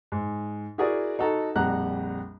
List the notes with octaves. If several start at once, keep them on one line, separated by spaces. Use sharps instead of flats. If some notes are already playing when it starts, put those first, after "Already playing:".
G#2
E4 F#4 G#4 A#4 D5
D#4 F#4 A4 A#5
A#1 F2 G3 F#5 A#5 F#6